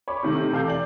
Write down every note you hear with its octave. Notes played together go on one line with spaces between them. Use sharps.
C#5 B5 D6
C3 D#3 A3
C3 E3 A4 F5 D6 G6
D5 F#7